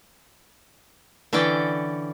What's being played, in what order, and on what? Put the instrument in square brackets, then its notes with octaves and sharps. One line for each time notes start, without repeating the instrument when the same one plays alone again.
[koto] D3 E3 C#4 D5 G5